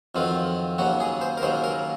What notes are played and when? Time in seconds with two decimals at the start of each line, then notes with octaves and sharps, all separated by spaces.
0.15 F2 D#3 F#3 C4 F4
0.78 D#2 C#3 F#3 F#4
1.00 G#4
1.21 C5
1.37 A#4
1.42 D#2 C#3 F#3 C5
1.64 A#4